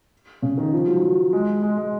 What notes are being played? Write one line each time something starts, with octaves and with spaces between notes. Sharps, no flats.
C#3
D#3
F3
F#3
F#3
G#3
G#3
G#3